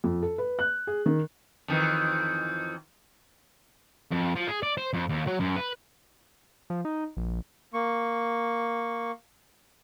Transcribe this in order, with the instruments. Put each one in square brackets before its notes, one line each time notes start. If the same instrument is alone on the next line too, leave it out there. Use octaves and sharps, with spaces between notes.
[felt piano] F2
A4
B4
F#6
G#4
D#3
[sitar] F2 D#3 E3
[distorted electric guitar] F2
F3
G#4
D5
C5
F2
D#2
F#3
F#2
B4
[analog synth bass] F3
D#4
A#1
[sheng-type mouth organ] A#3 C#6